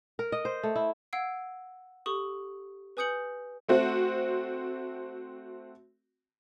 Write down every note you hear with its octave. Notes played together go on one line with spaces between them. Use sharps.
A#4
D#5
C5
A3
E4
F5 F#5 E6 G#6 C7 D7
G4 A4 C#6 D#6
B4 G#5 D#6 G6 C#7 F#7
A3 C4 F#4